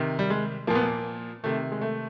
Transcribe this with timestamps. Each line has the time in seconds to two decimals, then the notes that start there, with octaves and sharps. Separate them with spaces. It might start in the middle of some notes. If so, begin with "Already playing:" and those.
Already playing: C3 D#3
0.19 G3
0.30 G#3
0.67 A#2 F3 A#3
0.75 B3
0.83 A#3
1.44 C3 D#3 A3
1.72 G#3
1.81 A3